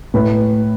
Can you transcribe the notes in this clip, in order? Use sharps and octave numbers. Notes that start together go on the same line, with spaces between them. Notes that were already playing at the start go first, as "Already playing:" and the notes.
A2 B4